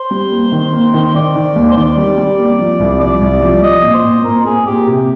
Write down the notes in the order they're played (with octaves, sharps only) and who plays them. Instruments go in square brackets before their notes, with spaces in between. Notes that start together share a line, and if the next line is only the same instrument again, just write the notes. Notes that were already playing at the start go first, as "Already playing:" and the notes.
Already playing: [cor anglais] C5
[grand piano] G3
A#3
D#3
A#3
D#3
[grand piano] D#3 [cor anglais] D5
[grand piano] D#3
D#2
[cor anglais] C5
[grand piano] D#3 [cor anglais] D5
[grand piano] G3
G3
A#3
F3
C2
[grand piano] F3 [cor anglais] D5
[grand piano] C2
F3
[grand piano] F3 [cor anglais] D#5
[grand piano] A#2
[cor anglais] C5
[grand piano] A#2
[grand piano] A#2 [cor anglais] A#4
[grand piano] A#3 [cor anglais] G#4
[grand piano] A#2 [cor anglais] G4
[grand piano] C3